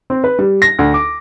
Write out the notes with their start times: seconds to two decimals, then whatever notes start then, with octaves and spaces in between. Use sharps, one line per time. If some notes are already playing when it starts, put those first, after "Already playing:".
0.10 C4
0.24 B4
0.39 G3
0.62 A#6
0.79 D2
0.94 D6